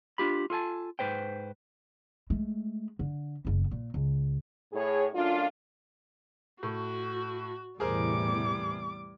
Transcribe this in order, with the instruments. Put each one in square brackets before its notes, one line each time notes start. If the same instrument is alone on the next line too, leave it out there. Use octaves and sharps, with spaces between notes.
[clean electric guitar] D4 F4 G4 B5
F4 A4 G#5 A5
G#2 B4 C5 G5
[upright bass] G#3 A3
D3
F#1 E2
A#2
C#2
[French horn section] A2 G#4 C#5
F#2 A3 D4 F4
[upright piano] A2 [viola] F#4
[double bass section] E2 A2 C3 [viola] G3 D6 [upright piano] G#4 A#4 C5